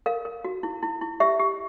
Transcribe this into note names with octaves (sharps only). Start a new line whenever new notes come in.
A#4 F5
A#4
F#4
E4
E4
E4
G4 E5
G4